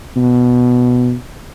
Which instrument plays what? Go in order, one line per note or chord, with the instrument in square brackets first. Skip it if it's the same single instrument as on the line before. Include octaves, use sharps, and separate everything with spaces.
[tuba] B2